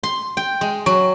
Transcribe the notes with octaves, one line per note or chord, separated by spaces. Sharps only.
C6
G5
G#3
F#3